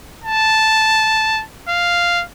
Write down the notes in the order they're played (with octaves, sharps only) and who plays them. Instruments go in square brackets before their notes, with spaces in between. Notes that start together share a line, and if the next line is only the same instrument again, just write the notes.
[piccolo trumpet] A5
F5